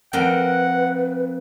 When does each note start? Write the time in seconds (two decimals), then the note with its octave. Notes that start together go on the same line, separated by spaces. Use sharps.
0.13 F2 A#4 B4 F#5 G5